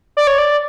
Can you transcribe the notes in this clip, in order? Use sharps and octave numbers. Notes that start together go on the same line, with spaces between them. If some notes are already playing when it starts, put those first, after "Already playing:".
D5
C#5
D5